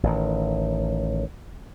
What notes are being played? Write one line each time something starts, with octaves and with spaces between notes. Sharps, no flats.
A1 D#3